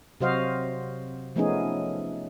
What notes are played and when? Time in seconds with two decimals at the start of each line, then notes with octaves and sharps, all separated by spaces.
0.21 C3 F#3 F#4 C5 D#5 F5
1.36 F3 A3 B3 C#4 D#4 G#4